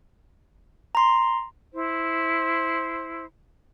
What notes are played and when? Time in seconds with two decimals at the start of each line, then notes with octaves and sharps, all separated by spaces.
0.95 A#5 C6
1.73 E4 C5